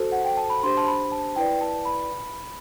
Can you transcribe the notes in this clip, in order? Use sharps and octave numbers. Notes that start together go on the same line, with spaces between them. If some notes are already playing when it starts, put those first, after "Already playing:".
Already playing: F#4 A4 C5 A5
F#5
G5
A5
B5
D4 G4 C5 C6
A5
B5
A5
E4 B4 D5 G5
A5
B5